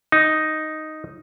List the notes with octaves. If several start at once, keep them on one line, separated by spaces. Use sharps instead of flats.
D#4